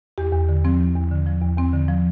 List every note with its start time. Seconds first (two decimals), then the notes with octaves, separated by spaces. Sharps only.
0.18 E2 G4
0.33 E2
0.49 D3
0.65 F3 C4
0.79 E2
0.96 E2
1.11 D3
1.27 F3
1.42 E2
1.58 E2 C4
1.73 D3
1.88 F3